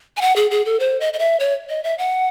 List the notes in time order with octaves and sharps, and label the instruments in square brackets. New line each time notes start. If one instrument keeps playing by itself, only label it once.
[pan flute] G#5
F#5
G#4
G#4
A4
C5
D#5
D#5
E5
C#5
D#5
E5
F#5